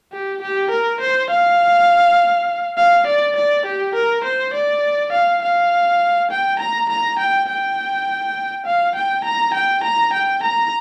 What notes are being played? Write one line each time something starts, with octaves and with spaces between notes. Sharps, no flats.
G4
G4
A#4
C5
F5
F5
D5
D5
G4
A#4
C5
D5
F5
F5
G5
A#5
A#5
G5
G5
F5
G5
A#5
G5
A#5
G5
A#5